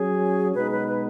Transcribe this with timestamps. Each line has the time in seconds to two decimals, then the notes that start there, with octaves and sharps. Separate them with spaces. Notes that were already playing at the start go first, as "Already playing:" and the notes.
Already playing: F#3 C#4 G#4
0.55 B2 G#3 B3 D#4 B4
0.71 B4
0.88 B4